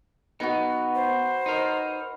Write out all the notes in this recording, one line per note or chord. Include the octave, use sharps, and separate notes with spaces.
B3 D#4 F#4 B4
C5
D#4 A#4